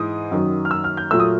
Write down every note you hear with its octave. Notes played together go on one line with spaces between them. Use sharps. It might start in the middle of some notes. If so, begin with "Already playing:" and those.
Already playing: G#2 E3 G#3 D#6
F#2 D#3 F#3
F6
E6
F6
G6
A#2 F#3 A3 E6
D#6